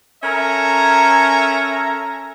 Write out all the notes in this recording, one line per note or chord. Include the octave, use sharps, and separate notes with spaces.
C#4 A4 A#4 E5 A#5